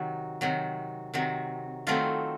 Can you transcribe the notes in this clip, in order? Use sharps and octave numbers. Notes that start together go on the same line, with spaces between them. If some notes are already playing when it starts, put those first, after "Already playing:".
Already playing: C3 D#3 F#3
C3 D#3 F#3
C3 D#3 F#3
D#3 F#3 A3 C4 F4